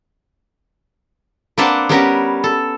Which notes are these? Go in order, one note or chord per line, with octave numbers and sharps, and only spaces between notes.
A#3 C4 D4 B4 F#5 A5
G3 B3 C#4 A#4 B4
A4